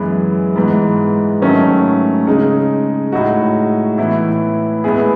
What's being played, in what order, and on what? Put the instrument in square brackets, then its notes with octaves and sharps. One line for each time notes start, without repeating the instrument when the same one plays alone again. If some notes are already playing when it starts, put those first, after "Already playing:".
Already playing: [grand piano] F#2 E3 G#3 B3
G#2 E3 G#3 B3
G#2 D#3 F#3 A3 C#4
C#3 G#3 D#4
A2 G#3 D#4 F#4
A2 E3 B3 E4
A2 G#3 B3 E4 G#4